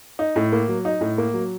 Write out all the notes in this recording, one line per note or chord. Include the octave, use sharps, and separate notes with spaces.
D#4
A2
A#3
F#3
D#4
A2
A#3
F#3